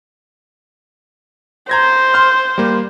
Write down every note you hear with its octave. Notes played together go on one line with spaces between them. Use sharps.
C5 A#5 G#6 A#6
C6 F6
G3 A#3